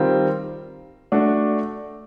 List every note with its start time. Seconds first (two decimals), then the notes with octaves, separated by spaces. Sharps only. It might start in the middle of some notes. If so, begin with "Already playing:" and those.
Already playing: D#3 G3 C4 F4 A#4
1.12 A3 D4 F#4